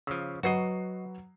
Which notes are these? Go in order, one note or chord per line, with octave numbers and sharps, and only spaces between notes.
C#3 F3 E6
F#3 F#4 B4 D#5 C7